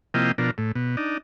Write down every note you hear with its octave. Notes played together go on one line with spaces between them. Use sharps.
C3 F3 A#3 E4 D#5 G5
B2 F3 D4 A#4
A2
B2
D4 D#4